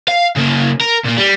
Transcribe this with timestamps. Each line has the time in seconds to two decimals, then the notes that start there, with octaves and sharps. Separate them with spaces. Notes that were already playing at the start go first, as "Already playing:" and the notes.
0.08 F5
0.37 C#3 A#3
0.81 A#4
1.04 A#2 A#3
1.17 G3